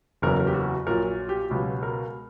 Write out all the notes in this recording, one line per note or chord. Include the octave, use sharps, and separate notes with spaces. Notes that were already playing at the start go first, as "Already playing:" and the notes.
F#1 E2 C#3 F#3 A#4
A#4
G4
F#4
A#1 A#2 F#3 A#4
G4
C#2 B2 F#3 G4
A#4